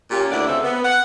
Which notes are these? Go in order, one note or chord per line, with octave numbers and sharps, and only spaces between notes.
A#2 C#4 G4
D2 D4 E4 G4 D5 F#5
D2 C#3 C4 A4 E5
B3
F#5